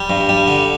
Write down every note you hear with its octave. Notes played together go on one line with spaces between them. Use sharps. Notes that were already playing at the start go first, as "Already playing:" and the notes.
Already playing: G3
G2
G3
D3